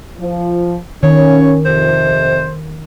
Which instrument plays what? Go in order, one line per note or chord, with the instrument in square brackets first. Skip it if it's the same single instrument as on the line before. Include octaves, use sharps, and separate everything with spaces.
[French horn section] F3
[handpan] D#3 [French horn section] C#4 [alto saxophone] C#5
[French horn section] F2 C3 [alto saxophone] C5